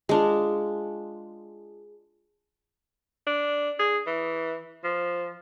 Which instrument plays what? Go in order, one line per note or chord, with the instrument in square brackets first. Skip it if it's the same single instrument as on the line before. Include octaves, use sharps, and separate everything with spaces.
[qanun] G#3 D4 F4
[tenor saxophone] D4
G#4
E3
F3